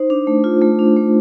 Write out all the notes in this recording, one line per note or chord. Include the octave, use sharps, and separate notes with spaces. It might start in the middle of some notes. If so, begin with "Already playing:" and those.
Already playing: D#4 C5
D4
A3
F4
A3
D4
A3